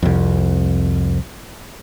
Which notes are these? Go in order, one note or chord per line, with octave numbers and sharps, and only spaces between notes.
C2 F2